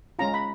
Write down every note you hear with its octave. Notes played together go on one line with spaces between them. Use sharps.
G#3 C#4 F4 A#5
B5